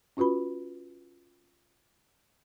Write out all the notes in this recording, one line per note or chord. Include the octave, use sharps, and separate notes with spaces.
C#4 F4 F#4 B4 B5